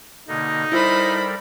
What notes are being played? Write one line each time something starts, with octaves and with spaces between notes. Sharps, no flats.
B2 D3 A#3 D#4
G3 E4 A4 A#4 C5 B5